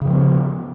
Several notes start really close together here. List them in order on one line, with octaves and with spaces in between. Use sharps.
C#3 F3 G#3 B3